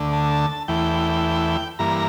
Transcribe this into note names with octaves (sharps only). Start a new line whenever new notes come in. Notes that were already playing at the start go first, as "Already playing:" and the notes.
Already playing: D2 D3 A3
A5
E2 E3 A3 G5
G2 E3 A#3 A#5